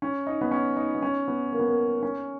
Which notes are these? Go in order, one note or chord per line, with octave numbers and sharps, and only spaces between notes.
C#4
D#4
B3
C#4
D#4
B3
C#4
B3
A#3
B3
A#3
C#4